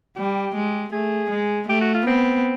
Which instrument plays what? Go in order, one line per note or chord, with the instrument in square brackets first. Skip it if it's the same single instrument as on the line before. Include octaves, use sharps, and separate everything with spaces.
[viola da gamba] G3 [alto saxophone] G4
[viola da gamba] G#3
[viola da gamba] A3 [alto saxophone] G#4
[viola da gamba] G#3
[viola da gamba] A3 [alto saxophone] G4
[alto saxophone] F#4
F4
[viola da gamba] B3 [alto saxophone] C4